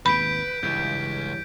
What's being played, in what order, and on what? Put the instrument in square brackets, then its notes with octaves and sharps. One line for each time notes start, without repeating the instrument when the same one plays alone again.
[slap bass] G#1 D#2 B2 [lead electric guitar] B4 [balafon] B5 [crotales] G6 B6 D7
[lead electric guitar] C#2 [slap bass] G2 E3 [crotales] G6